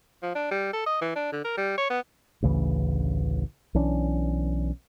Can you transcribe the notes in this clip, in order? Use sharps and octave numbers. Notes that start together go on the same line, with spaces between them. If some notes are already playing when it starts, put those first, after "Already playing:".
F3
D4
G3
A4
D#5
E3
D4
D3
A#4
G3
C#5
B3
A1 D2 C#3 E3
B1 E3 C#4 D4